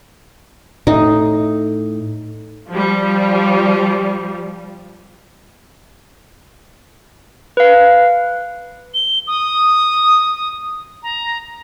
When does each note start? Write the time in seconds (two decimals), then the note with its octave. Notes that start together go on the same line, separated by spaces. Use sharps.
0.87 A2 D#4
2.69 F3 G3
7.57 B4 F5
8.94 G7
9.27 D#6
11.03 A#5